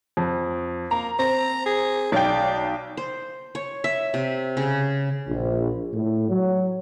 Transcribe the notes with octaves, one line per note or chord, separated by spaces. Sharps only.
F2
A#3 A#5
C4 A#5
G#4
B1 D5 G5
C5
C#5
E5
C3
C#3
A#1
A2
F#3